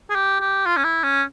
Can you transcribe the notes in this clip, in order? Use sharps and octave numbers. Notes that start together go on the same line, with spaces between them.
G#4
G4
G4
F4
C#4
E4
C#4